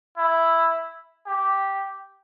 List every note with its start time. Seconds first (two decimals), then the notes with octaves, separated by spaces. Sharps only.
0.17 E4
1.26 G4